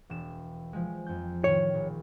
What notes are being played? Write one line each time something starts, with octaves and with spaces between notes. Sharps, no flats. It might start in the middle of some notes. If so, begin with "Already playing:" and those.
E1 E7
F3 G#3
F2 G6
A2 D#3 C#5
A#1